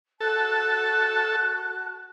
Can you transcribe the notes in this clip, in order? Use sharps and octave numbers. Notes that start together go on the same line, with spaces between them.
F#4 A4 A5 F#6